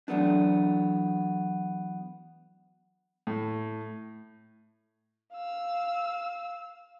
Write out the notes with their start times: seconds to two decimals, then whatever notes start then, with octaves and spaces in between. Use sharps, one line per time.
0.08 E3 F#3 A3 B3 D4
3.27 A2
5.34 F5 E6